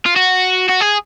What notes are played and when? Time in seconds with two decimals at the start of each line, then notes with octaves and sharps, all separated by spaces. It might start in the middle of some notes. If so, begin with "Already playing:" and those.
0.06 F4
0.16 F#4
0.69 F#4
0.81 G#4